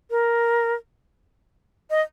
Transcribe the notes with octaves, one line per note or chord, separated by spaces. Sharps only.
A#4
D#5